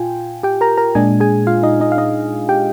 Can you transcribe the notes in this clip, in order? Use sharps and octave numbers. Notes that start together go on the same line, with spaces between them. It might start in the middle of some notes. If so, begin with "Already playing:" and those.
Already playing: A#2 F4 G5 G#5
G4 G5
A#4 A#5
A#4 A#5
A#2 G#3 D4 G#4 G#5
G#4 G#5
F4 F5
D#4 D#5
D#4 D#5
F5
D#4 D#5
G4 G5